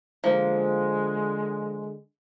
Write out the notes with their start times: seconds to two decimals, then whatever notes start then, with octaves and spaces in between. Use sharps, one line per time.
0.24 D3 F3 G#3 A#3